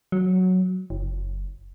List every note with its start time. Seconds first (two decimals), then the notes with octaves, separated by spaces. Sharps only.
0.12 F#3
0.90 F#1